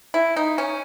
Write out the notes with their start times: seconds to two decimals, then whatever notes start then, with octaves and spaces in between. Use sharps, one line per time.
0.14 E4
0.36 D#4
0.58 C#4